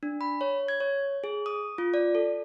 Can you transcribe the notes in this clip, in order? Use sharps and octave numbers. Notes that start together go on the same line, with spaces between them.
D4
B5
C#5
G#6
C#5
G#4
D#6
F4
D5
A4